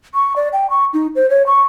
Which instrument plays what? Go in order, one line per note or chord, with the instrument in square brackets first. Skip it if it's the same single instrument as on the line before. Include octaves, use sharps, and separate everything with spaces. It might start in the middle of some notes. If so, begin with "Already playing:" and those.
[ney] C#6
D5
G5
C#6
D#4
C5
C#5
C#6